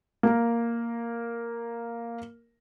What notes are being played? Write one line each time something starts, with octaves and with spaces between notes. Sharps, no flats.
A#3 A#4